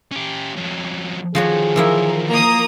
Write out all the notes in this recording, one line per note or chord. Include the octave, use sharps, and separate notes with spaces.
C#4 G4
F2 C#4
D3 D#3 F3 F#4 G#4 C#5
E3 F3 E4 A#4
A#3 A#5 D#6